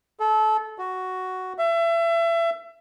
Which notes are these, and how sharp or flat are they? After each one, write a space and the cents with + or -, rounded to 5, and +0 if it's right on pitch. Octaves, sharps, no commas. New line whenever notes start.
A4 -25
F#4 +5
E5 +30